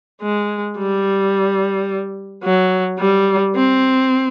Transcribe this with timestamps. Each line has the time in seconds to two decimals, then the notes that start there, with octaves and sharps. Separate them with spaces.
0.22 G#3
0.78 G3
2.43 F#3
2.99 G3
3.55 C4